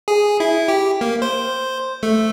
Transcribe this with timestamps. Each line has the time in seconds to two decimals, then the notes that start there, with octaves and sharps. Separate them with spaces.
0.08 G#4
0.40 E4
0.68 G4
1.01 A#3
1.22 C5
2.03 A3